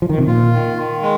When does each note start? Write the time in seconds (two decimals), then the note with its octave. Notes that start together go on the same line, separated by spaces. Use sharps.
0.02 F3
0.09 D#3
0.18 C3
0.27 A#2 F4
0.53 D#3
0.77 D#3
1.02 G#3